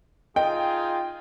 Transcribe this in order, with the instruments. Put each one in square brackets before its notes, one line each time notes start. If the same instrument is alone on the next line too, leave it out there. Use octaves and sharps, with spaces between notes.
[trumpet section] D#4 F4 G#4 [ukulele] D#5 [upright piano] G5